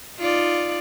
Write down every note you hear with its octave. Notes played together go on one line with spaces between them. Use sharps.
D#4 F4 D5